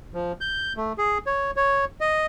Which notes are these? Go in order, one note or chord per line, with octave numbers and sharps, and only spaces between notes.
F3
G6
A3
G#4
C#5
C#5
D#5